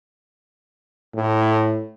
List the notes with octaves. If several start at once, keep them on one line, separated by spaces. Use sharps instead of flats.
A2